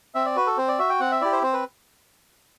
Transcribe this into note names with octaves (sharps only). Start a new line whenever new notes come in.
C4 E5
D5
F#4 B4
A4
C4 C5
D5
F#4 E5
G5
C4 F#5
E5
E4 G4 D5
C5
C4 C5
B4